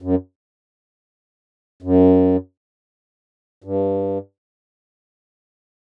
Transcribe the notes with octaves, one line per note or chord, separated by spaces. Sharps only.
F#2
F#2
G2